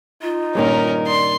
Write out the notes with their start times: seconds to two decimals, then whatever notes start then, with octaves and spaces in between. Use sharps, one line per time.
0.22 D#4 F4
0.55 G2 A#2 D#3 C#4 A#4
1.07 D5 C6